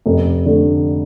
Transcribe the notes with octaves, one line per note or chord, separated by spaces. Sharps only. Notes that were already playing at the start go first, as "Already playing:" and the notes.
F1
D3 A3 D4